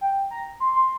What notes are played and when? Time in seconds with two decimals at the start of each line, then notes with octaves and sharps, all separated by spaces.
0.01 G5
0.31 A#5
0.60 C6
0.76 C6